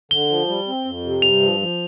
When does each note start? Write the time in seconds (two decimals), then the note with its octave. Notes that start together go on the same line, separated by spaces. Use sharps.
0.11 D3 G7
0.29 F3
0.47 G3
0.67 C4
0.85 F2
1.04 C3
1.22 G2 F7
1.42 F3
1.60 F3